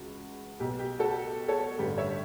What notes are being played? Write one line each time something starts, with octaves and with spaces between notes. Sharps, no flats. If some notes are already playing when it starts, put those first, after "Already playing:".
Already playing: C#2 E3 F#4
B1 B2 G4
G4
F#4 A4
A4 C#5
A1 G2 D3 G4
C#5 E5